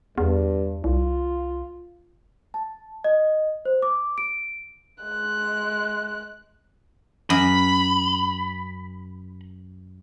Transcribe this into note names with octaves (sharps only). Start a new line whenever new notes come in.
E2 G2
C2 F4
A5
D#5
C5
D6
D7
G#3 F#6
F#2 B5